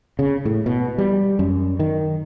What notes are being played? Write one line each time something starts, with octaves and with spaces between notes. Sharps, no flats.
C#3
A2
B2
G3
F#2
D#3